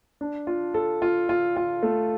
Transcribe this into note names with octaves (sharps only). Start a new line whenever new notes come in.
D4
F4
A4
F4
F4
F4
A3